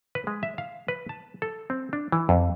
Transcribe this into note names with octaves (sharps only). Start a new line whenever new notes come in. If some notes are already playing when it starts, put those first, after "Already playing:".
B4
G#3
E5
F5
B4
A5
A4
C4
D4
E3
F2